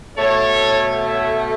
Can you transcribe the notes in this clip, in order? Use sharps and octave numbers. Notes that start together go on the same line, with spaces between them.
B2 A3 A4 C#5
C#5 E5